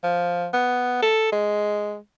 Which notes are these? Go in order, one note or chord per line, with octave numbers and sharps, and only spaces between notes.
F3
B3
A4
G#3